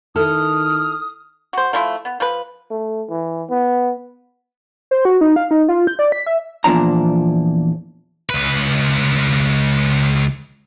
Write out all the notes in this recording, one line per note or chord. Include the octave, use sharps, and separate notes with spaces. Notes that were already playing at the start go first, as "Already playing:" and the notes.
D#3 E4 A4 D#6 F6
F#4 C5
F3 A3 E4 F4
B3
F3 B4
A3
E3
B3
C5
F#4
D#4
F5
D#4
F4
G6
D5
B6
E5
E2 A#2 F3 D4 A#5
C#2 B4